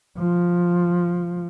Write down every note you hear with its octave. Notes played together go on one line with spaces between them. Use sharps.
F3